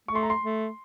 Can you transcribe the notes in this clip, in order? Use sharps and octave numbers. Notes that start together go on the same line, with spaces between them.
A3 C#6
C6
A#5
C6
A3